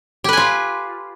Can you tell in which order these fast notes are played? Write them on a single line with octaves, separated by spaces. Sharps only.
G4 B4 G#5 F4